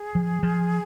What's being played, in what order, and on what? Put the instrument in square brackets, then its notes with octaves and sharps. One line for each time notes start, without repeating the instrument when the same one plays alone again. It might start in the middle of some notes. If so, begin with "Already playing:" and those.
Already playing: [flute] G#4
[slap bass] F3
F3